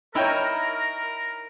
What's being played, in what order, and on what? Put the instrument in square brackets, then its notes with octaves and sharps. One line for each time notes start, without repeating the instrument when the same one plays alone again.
[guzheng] D#4 E4 [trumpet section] A#4 [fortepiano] C#5 G5 E6